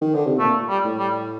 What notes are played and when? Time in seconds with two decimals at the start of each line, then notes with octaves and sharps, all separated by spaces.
0.01 D#3
0.14 D3
0.27 C3
0.39 A#2 A3
0.69 G3
0.84 A2
0.99 G3